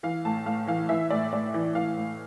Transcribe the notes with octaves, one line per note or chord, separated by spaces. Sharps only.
E3 F5
A2 A5
A2 F5
E3 F5
E3 E5
A2 D5
A2 D5
E3
E3 F5
A2